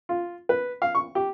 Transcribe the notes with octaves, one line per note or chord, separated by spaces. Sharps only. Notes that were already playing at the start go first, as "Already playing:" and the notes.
F4
B4
F5
C#6
G4